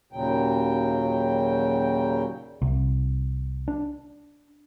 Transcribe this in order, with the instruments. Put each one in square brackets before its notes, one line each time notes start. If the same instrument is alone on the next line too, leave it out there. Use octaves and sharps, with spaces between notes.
[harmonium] D#2 A#2 C#3 F#3 G5
[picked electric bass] C2
D4